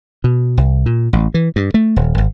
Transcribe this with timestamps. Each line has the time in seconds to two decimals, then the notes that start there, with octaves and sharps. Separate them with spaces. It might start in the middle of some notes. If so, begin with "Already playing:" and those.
0.24 B2
0.57 C2
0.86 A#2
1.13 A1
1.34 E3
1.56 G2
1.74 A3
1.96 D#1
2.18 G#1